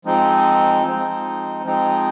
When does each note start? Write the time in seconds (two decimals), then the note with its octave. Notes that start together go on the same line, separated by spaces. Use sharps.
0.05 F3 G#3 C4 D#4
0.84 F3 G#3 C4 D#4
1.64 F3 G#3 C4 D#4